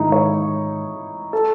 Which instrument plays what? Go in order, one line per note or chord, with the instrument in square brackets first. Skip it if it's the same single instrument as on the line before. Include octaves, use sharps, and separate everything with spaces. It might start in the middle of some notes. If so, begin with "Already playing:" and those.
Already playing: [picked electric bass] G#2 D#3 G#3 [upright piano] D#4 E4
[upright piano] C#5
A4